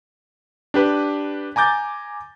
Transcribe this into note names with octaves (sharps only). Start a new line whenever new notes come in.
D4 G4 B4
G#5 A#5 D6 G6 A6